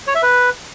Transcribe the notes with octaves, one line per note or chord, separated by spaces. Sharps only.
C#5
E5
B4